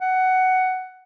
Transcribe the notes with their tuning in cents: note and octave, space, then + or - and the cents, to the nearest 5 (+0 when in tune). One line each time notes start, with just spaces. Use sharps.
F#5 +10